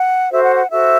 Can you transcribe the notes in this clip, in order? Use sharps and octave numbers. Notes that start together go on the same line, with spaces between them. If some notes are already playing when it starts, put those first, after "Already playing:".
Already playing: F#5
F#4 A4 C5 E5
F#5
F#5
F#4 A4 C5 E5